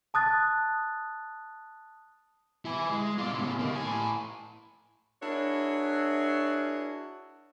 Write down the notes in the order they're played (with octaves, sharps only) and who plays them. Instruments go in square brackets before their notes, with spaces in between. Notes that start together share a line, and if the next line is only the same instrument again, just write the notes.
[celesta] A5 D#6 F#6 A6
[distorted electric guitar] E4 G#5
G#3
F4 D5
A2 C#3
A#3 D#4
A2 G#5
[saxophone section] D4 E4 F#4 G#4 A#4 C#5